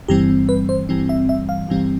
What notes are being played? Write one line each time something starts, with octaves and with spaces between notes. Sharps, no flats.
G1 G2 E3 G3 C4 G4
B4
C5
G1 G2 E3 G3 C4
E5
E5
F5
G1 G2 E3 G3 C4